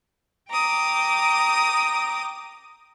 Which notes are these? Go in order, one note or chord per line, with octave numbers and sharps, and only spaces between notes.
G5 A#5 D6 D#6